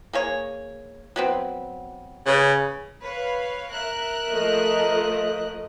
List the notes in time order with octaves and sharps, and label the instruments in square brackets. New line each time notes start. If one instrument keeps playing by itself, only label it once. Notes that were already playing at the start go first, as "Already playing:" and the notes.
[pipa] A#3 G#4 C#5
F#3 B3 C4
[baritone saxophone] C#3 [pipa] B4
[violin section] B4 C#5 F5
A#4 E5 F#6
[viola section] F3 A3 D#5